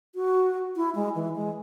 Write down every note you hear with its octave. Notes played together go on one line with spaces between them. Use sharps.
F#4
E4
G#3
E3
G#3